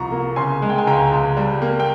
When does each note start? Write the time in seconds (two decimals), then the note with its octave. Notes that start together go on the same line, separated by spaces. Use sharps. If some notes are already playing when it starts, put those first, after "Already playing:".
Already playing: C2 F3 A#5 C#6
0.12 A#3
0.36 C#3 G#5 C6
0.62 G#3
0.69 G5
0.78 G#5
0.87 C#2 G5 A#5
1.12 C#2
1.37 G3
1.62 A#3
1.80 G5